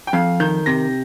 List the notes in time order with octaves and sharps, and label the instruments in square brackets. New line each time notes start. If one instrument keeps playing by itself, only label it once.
[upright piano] G5
[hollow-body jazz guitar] F2 [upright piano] F5
[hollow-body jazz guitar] D#3 [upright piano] G6
[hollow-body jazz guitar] C3 [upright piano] A#6